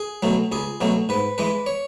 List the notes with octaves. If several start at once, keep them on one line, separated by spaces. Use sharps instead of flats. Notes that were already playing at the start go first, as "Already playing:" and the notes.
Already playing: G#4
B2 F#3 A3
C#2 G#4
B2 F#3 A3
G#2 B4
E3 G#3 B4
C#5